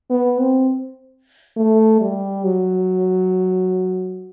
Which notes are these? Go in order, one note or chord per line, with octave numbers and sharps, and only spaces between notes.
B3
C4
A3
G3
F#3